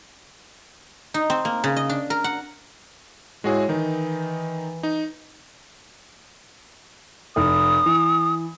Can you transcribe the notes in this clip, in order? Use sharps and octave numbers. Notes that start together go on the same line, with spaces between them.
D#4
C4
A#3
C#3
D#5
D4
A#4
F#5
A2 G#3 F#4 G#4
D#3 E3 D#4
D#4
F1 D#6
E3